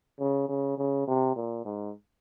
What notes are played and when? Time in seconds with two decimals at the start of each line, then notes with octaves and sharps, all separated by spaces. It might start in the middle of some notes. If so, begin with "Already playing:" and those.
0.20 C#3
0.49 C#3
0.78 C#3
1.08 C3
1.36 A#2
1.65 G#2